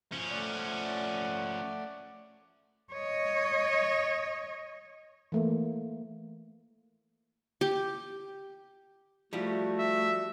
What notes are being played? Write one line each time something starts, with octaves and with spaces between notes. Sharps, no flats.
F3 C#4
A3 D5 F#5
C#5 D#5
E3 A3 A#3
G4
F3 G3 A3 E4 F#4
E5